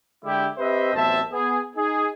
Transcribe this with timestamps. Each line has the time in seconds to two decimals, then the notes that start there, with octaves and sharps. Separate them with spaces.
0.25 D3 G#3 D4 E4 G4
0.58 C4 G4 B4 C5 D#5 E5
0.94 A1 F#2 B3 C4 E5 A5
1.32 B3 G#4
1.76 D#4 G#4